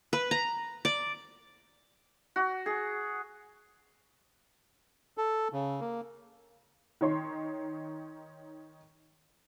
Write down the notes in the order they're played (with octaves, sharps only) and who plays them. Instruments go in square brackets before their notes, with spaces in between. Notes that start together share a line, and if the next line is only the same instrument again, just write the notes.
[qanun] B4
A#5
D5
[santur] F#4
G#4
[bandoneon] A4
C#3
A#3
[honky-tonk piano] D#3 D#4 C#5 C6